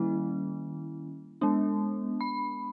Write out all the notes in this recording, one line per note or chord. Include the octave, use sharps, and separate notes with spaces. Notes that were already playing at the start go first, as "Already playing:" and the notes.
Already playing: D#3 G3 A#3 C#4 E4
G#3 B3 D4
B5